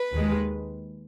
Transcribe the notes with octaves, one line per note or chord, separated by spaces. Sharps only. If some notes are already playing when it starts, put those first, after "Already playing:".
Already playing: B4
D#2 D#3 G#3